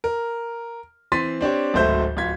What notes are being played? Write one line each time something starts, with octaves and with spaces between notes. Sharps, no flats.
A#4
E3 C4 C6 A6 B6 D#7
C4 D4 G4 C#5
D1 G#1 A3 C5 E5 G6
D1 F4 G#6 B6